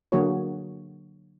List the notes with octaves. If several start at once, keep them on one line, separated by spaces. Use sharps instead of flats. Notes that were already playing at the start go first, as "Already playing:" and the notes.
D3 F#3 A#3 F#4 G#4 C#5